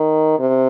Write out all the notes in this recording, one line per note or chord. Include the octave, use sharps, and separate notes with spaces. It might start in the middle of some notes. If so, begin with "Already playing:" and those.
Already playing: D#3
C3